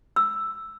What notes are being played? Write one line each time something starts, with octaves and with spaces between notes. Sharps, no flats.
E6